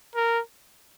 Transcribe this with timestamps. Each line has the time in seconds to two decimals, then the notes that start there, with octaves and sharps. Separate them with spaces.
0.15 A#4